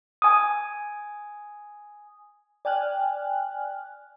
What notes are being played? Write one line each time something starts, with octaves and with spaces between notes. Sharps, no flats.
G#5 D#6
D5 G5 G#5 F6 F#6